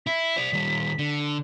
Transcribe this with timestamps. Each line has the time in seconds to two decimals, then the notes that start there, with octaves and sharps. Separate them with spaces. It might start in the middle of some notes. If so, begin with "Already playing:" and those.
0.07 E4 B6
0.37 C5 D5
0.53 D#3 G3
0.99 D3